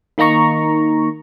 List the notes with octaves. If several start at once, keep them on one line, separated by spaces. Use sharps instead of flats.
D#3 A#3 D#4 A#5 C#6